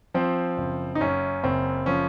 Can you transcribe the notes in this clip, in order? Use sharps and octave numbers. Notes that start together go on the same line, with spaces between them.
F3 C4
F#1
D#4
F#2 C#4
F#1 C4
F3 C#4